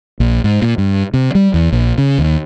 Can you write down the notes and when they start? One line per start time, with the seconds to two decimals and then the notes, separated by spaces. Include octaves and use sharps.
0.20 A#1
0.44 G#2
0.62 A#2
0.78 G2
1.14 C3
1.35 G3
1.54 E2
1.72 A#1
1.98 C#3
2.18 D#2